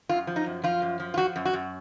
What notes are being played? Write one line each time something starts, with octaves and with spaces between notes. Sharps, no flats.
F#2 F4
F3
D#4
F#2
F3 F4
F#2
F3
F4
F3 F#4
F#2
F#4
F#2